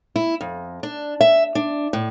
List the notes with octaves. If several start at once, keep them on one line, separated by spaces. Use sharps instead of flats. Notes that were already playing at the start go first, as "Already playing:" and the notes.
E4
F2
D4
E5
D4
A2